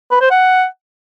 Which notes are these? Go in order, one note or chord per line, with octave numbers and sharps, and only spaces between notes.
B4
C5
F#5